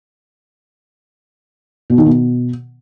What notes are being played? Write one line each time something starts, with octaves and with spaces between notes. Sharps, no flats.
B2
D#3
B2